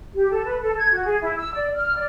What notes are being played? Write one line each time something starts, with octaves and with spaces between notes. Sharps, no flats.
G4
A4
B4
A4
G#6
F#4
G#4
E4
E6
D5
F6
D5